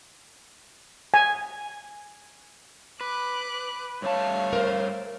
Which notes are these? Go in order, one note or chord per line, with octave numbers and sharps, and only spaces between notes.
G#5
B4 D6 F#6
G2 A3 C#5 F5 A5
A#4 C5